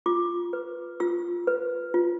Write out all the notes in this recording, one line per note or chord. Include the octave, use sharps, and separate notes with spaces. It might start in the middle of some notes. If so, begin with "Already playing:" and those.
F4 D6
B4
F4 E6
B4
F4